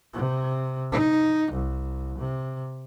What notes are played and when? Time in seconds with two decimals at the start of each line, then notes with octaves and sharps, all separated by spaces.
0.13 C3
0.92 D#4
1.53 C2
2.19 C3